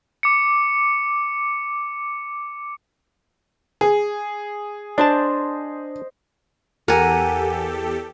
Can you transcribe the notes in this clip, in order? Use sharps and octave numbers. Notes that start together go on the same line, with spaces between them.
D6 C#7
G#4
D4 C5 D#5 A5
E2 G4 A4 A#4 F#5 G#5